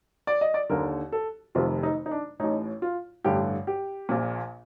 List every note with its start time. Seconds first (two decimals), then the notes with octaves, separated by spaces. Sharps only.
0.27 D5
0.41 D#5
0.54 D5
0.70 D#2 D3 A#4
1.12 A4
1.55 F1 F2 C3 D#3 F4
1.83 D#4
2.06 D#4
2.11 D4
2.40 A1 A2 D#4
2.82 F4
3.24 A1 G2 D3 G4
3.67 G4
4.09 A#1 A#2